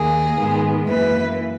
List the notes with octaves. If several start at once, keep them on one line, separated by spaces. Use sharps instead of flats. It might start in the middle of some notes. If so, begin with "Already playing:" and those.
Already playing: D#2 D#3 A#3 G#4
G#2 D#3 G#3 B3
F#2 E3 A#3 B4